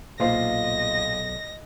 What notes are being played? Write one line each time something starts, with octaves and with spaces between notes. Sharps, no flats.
B1 A#2 F4 C5 D#5 A#6